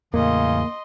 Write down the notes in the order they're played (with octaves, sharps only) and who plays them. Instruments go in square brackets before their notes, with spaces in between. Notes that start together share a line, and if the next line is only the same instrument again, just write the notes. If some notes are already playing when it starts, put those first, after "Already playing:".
[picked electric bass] E2 A2 [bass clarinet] C#3 [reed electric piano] A#3 [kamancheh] D#5 C6